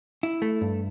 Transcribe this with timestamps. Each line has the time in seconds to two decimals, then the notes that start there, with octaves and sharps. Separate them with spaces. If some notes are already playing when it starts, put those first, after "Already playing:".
0.23 E4
0.42 A3
0.61 G2